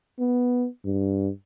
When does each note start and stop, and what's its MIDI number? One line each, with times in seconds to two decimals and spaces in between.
0.19 0.67 59
0.85 1.29 43